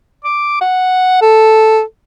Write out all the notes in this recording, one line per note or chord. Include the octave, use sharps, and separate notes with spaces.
D6
F#5
A4